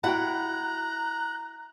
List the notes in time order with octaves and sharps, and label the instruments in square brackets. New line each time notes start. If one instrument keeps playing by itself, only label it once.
[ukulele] E4 F#4 G5 [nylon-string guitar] F#5 [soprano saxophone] A#5 [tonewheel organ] F#6